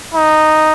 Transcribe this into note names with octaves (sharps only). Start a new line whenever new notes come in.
D#4